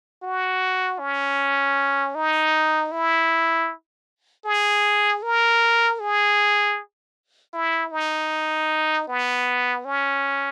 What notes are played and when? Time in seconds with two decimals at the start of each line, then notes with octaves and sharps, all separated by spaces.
0.23 F#4
0.99 C#4
2.15 D#4
2.92 E4
4.45 G#4
5.23 A#4
6.00 G#4
7.54 E4
7.92 D#4
9.08 B3
9.85 C#4